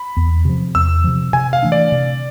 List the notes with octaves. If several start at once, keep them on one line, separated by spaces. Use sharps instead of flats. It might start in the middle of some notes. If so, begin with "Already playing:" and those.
Already playing: B5
E2
C3 F3
E2 E6
C3 F3
C3 G#5
F5
E3 A3 D4
D5
C3